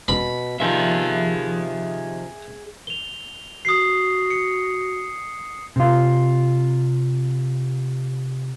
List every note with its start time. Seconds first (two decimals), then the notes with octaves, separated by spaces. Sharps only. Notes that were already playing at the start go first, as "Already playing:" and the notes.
0.08 B2 B5
0.60 C3 D#3 F3 G#4 E5
2.87 F7 G7
3.65 F#4 D#6 C7
4.30 C#7
5.76 C3 F4